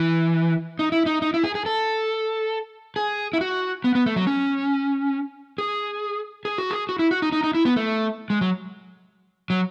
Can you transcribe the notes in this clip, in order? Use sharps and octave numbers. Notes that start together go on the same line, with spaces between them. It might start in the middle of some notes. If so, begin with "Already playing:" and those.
Already playing: E3
D#4
E4
D#4
D#4
E4
G#4
G#4
A4
G#4
E4
F#4
B3
B3
A3
F#3
C#4
G#4
G#4
F#4
G#4
F#4
E4
F#4
D#4
D#4
D#4
E4
B3
A3
G#3
F#3
F#3